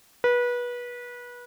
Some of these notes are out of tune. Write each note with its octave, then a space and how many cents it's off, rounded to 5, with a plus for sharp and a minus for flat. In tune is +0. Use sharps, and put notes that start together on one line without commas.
B4 -25